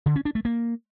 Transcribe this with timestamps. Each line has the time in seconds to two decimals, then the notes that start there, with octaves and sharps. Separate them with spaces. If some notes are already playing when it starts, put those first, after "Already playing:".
0.06 D3
0.16 C#4
0.25 D4
0.35 A3
0.45 A#3